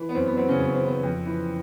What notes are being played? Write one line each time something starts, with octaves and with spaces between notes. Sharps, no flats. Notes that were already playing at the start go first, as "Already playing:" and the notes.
Already playing: E3
B3
F#2 C4
B3
F#3 C4
C#3 C#4
F#2 B3
C4
D#3 B3
C4
F2
E3